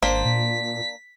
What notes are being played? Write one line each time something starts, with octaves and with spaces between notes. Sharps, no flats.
G#1 A#3 D4 C5 B6
A#2